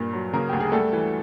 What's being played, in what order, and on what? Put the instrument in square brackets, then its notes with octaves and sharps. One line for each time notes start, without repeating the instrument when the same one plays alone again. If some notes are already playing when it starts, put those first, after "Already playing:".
Already playing: [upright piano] G2 A#2
F#3
C#3 A#3 A#4
D2 G4
G#4
G3 A3 A4
E3